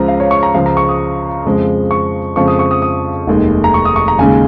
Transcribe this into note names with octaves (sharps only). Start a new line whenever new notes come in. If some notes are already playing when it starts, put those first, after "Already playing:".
Already playing: C#2 C#3 F3 G#3 A#5
F5
C#5
C#6
A#5
C#2 C#3 F3 G#3 F5
A#5
C#6
D#6
F2 C#3 F3 G#3
C#6
F2 C#3 F3 G#3 C#6
D#6
C#6
D#6
D#6
F1 D#2 D#3 G#3
A#5
C#6
D#6
C#6
A#5
D#2 C#3 G#3 G#5